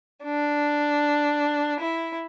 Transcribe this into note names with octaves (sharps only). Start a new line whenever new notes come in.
D4
E4